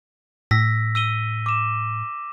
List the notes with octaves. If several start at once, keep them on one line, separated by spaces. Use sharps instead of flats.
A2 E6 A#6 B6
E6 D#7 G7
D6 E7